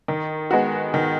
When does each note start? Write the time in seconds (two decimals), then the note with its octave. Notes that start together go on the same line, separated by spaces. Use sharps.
0.08 D#3
0.51 G#3 B3 F#4
0.94 D#3